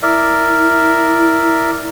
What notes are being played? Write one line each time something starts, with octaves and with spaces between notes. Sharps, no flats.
E4 A#4 D5 E5